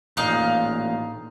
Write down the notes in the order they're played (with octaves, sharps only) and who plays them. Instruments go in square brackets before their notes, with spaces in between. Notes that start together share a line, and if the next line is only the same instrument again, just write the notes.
[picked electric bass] A1 A#2 [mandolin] D#4 F5 F#6